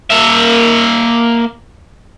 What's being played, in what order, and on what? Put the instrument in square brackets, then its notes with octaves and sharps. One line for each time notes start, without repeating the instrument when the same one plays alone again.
[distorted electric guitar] A#3 E5